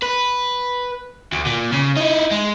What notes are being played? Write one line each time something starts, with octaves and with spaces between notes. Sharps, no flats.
B4
D2
A#2
C#3
D#4 E4
G#3